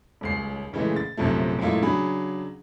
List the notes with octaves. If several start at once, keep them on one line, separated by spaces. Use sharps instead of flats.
D#1 C#2 C7
A#2 C#3 E3 G#3 A3
A6
A#1 F#2 C3 F3 A3
F#2 A#2 G#3 A3 E4 F4
C#3 F#3 D4 G#4 B5